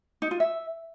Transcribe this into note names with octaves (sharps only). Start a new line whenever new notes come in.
D#4
F4
E5